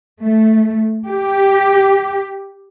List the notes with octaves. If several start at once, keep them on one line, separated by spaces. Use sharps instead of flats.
A3
G4